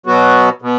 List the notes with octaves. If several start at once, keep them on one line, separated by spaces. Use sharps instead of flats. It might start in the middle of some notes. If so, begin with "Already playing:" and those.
B2 F#3 B3 F#4
B2